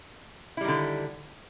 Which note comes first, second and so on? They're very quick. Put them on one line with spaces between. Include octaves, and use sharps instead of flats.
E4 G3 D#3 D3